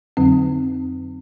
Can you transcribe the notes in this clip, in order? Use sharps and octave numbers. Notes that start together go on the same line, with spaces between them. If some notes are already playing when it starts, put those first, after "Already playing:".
F2 D3 F#3 C4